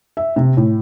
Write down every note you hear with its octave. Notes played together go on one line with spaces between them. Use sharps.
E5
C3
A2